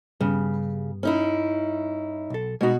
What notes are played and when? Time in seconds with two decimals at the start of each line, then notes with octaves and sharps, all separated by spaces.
0.20 G2 C#3 G3 B3
1.03 C#4 D#4 E4
2.30 B1 A4
2.61 B2 G#3 B3 D#4 F#4